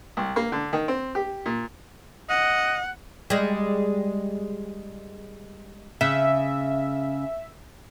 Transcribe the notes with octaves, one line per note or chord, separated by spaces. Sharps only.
C2
A#3
D3
D#3
C4
G4
A#2
D#5 F#5
G3 G#3
C#3 E5